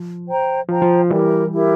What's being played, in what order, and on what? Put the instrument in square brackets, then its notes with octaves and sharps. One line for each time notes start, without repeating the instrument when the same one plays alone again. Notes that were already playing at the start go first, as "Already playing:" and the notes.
Already playing: [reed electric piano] F3
[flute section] C5 G5 A#5
[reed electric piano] F3 [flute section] C5 G5 A#5
[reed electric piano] F3
[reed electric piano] E3 G3 [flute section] E4 G4 A#4
[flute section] E4 G4 A#4